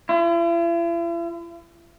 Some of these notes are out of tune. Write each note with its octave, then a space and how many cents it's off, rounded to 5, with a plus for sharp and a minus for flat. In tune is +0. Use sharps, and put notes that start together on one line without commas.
E4 +45